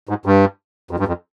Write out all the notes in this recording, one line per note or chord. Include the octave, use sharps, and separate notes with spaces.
G#2
G2
F2
G2
F2